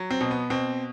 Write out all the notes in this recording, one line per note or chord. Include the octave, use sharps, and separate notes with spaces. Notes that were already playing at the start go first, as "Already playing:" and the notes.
Already playing: F#3
C4
B2
B3
B2 C4